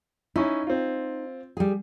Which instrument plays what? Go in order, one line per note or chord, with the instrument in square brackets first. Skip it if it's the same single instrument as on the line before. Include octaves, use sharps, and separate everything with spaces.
[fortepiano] C#4 E4 [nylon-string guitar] D#4
[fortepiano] C4 F4
[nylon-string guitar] G3 G#4